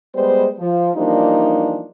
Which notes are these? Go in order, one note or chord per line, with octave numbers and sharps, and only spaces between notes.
G3 G#3 B3 C5
F3
E3 F3 G3 A#3 D4 D#4